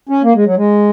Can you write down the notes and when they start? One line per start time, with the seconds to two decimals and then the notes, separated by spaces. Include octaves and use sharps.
0.09 C#4
0.24 A#3
0.35 G#3
0.45 F#3
0.57 G#3